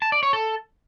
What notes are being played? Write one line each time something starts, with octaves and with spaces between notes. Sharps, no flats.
A5
D5
C#5
A4